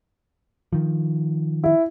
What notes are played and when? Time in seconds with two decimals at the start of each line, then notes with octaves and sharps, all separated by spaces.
0.73 D#3 F3
1.64 E4